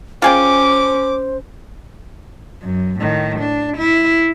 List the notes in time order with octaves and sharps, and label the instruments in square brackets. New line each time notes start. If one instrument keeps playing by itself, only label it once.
[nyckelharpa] C#4 [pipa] F4 G#4 G5 [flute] C5 [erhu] D6
[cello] F#2
A2 D#3
D4
E4